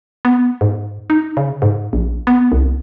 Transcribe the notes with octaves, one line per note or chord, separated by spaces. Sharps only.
B3
G#2
D#4
C#3
G#2
A#1
B3
C2